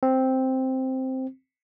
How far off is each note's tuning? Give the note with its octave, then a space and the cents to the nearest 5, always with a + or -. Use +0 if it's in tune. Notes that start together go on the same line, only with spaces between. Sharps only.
C4 +0